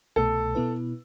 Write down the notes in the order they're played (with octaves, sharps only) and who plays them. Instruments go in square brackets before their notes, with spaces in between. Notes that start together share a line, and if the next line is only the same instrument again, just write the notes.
[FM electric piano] C2 B2 A3 [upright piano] A4
[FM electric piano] B2 B3 E4 B4